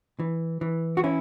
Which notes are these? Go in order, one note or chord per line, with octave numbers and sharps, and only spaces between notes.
E3
E3
F#4
C#4 E4